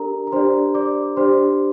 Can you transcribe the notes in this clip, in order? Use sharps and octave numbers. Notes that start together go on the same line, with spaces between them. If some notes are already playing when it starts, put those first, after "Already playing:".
Already playing: D4 G4 A4 A#4 D5 A#5
A#5
D4 G4 C5 D5 C6
D5 D6
D4 G4 C5 D5 C6